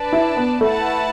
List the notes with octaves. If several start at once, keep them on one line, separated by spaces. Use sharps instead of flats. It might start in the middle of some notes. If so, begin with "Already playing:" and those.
Already playing: D4 B4 D5 A5
E4
B3
A3 E4 B4 F#5 A5